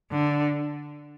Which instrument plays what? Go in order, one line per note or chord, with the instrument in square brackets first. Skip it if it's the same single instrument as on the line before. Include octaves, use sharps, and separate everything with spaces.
[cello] D3